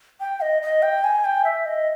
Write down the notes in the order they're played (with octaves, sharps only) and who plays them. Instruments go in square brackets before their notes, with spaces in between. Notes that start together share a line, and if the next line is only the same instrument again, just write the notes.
[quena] G5
D#5
D#5
G5
G#5
G5
E5
D#5